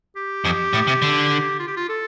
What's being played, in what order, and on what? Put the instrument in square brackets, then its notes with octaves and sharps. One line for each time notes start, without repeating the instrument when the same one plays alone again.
[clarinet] G4
[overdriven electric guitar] F2
A2
C3
D3
[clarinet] F4
G4
F4
A4